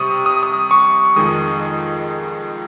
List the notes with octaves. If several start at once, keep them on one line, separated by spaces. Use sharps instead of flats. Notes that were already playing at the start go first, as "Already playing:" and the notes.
Already playing: C3 G3 C#6 D#6
D#6
D#6
C#6
F2 D#3 G#3 D#6